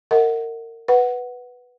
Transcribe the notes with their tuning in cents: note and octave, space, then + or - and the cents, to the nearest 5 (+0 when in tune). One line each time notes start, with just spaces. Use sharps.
A#4 -30 D#5 +35 F#5 +0
B4 +0 F#5 +0